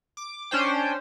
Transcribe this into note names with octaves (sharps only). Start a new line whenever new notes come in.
D6
C#4 D4 C5 G5